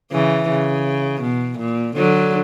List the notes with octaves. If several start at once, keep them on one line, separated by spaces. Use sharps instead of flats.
C#3 E3
C#3
B2
A#2
D3 F#3